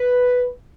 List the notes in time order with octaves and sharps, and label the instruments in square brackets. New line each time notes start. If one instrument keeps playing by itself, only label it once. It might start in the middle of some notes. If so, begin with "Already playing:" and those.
Already playing: [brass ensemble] B4